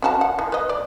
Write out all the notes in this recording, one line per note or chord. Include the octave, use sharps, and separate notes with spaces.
C#4 F#4 A5
F#5
E3
B4 D#5
D5